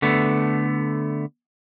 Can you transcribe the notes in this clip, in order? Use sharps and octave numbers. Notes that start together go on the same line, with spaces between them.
D3 A3 B3